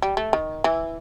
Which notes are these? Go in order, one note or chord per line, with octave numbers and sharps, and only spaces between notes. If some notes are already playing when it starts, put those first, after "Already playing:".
G3
A3
D#3
E3